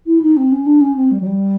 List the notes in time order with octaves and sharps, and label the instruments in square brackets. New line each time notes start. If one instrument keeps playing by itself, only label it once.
[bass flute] E4
D#4
C4
C#4
D4
C#4
C4
G3
F#3
G3